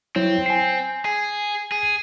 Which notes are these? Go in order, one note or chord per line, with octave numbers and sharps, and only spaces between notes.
F#3 C4 E4 C#5
G#5 C7
G#4
G#4